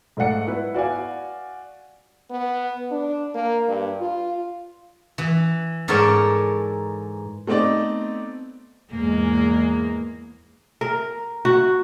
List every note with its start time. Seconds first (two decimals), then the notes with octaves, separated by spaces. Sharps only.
0.17 G#2 A3 D5 F#5 C#7
0.46 B3 E4 B4
0.74 F#4 D5 F5 G#5
2.31 B3
2.91 D4
3.35 A#3
3.69 G2
4.01 F4
5.18 E3
5.88 G#2 A4 A#4 C#5 D5 A5
7.47 A3 B3 C4 D#4 D5
8.91 E2 G#2 G#3 A#3
10.81 A#4
11.45 F#4